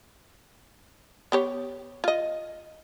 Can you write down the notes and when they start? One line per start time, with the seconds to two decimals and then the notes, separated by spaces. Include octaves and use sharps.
1.32 B3 G4 C#5
2.04 F4 D#5